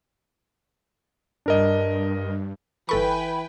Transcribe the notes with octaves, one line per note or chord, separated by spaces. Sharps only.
G2 D4 A#4 D#5
G1 E3 A4 B4 G5 G#5 B5 C#6